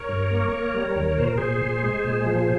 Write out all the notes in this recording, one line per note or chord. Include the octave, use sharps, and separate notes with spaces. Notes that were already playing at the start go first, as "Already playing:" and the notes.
Already playing: A#4 C#5
G2
A#3
A#3
G3
D#2
A#2 C5
A#4
A#2 G#4 C5
A#2
G#3
A#2
F3